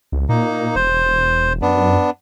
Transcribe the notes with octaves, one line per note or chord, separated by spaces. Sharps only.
C#2
A#2 A#3 D#4
E1 C5
F#2 B3 D4